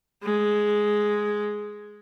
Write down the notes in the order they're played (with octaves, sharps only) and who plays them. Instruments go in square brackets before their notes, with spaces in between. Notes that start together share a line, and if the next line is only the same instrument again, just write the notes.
[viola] G#3